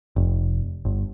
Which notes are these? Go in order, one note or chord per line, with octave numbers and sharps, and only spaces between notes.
F1
G1